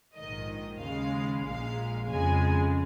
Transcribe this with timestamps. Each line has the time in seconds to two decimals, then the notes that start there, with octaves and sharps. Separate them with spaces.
0.16 A#1 G#2 D#3 D#5
0.81 D#2 C#3 G#3 F5
1.44 A#1 A#2 G#3 F5
2.09 F2 C#3 G#3 G#5